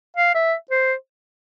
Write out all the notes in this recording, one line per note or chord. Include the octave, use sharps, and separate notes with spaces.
F5
E5
C5